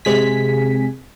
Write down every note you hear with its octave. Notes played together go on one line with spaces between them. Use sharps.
C3 G#3 G#5 B6